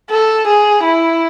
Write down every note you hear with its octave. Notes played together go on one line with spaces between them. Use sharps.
A4
G#4
E4